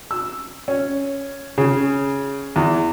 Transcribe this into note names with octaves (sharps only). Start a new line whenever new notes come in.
E6
C#4
C#3
E2